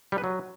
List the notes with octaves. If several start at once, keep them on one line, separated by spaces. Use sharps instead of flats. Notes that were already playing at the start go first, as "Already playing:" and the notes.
G3
B4
F#3